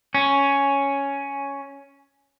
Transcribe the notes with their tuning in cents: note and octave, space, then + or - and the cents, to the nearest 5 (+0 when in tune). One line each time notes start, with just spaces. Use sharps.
C#4 +5